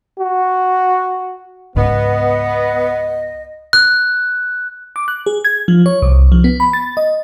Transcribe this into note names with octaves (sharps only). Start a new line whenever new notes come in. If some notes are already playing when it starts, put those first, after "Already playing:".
F#4
C#2 G#2 B3 D#5
F#6
D6
F#6
G#4
G#6
F3
C#5
C2
F3
B3
B5
A6
D#5